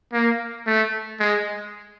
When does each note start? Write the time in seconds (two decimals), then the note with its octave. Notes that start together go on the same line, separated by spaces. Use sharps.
0.13 A#3
0.66 A3
1.20 G#3